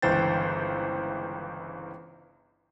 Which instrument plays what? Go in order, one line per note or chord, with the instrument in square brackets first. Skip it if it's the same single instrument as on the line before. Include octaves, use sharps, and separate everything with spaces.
[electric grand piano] G1 C#2 E3 C5 G5 A6